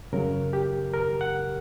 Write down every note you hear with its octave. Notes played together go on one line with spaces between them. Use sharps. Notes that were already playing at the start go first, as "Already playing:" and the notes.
F#2 C#3 F#3 A#4
G4
A#4
F#5